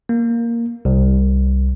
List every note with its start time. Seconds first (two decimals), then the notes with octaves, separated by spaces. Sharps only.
0.09 A#3
0.85 C2